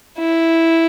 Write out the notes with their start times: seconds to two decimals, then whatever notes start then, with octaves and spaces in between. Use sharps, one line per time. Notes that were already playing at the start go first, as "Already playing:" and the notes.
0.18 E4